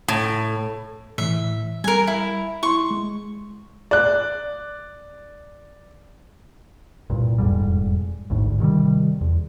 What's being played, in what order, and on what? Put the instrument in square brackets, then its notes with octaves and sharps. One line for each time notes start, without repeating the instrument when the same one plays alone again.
[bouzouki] A2
[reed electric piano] A2 E3 [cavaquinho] E5
[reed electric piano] G3 [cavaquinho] A#4 G#5
[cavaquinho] E4
[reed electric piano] E4 C6 [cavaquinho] C#6
[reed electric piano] G#3
[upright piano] D5 F#6
[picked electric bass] C2 G2 A#2
E1 F2 G#2 G3
A1 D2 G#2
C3 D#3 F#3 G3
E2